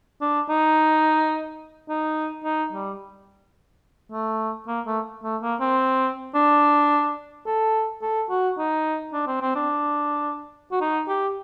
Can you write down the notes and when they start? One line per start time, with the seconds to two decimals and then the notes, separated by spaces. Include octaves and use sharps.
0.21 D4
0.49 D#4
1.89 D#4
2.44 D#4
2.73 G3
4.12 A3
4.67 A#3
4.86 A3
5.24 A3
5.42 A#3
5.60 C4
6.35 D4
7.46 A4
8.02 A4
8.30 F#4
8.58 D#4
9.13 D4
9.27 C4
9.42 C4
9.56 D4
10.72 F#4
10.81 D#4
11.08 G4